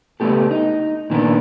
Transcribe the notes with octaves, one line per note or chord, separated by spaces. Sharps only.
C#2 A3 B3 G4 A4
D#4
A#2 D#3 B3 D4